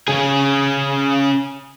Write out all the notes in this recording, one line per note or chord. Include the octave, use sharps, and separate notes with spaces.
C#3 G#4